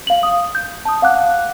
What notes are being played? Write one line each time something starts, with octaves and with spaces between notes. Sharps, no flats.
F5 F#7
D#6
G6
A5 D#6
F5 F#5 D6 F#6